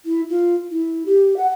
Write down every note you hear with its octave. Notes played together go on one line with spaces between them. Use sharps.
E4
F4
E4
G4
F#5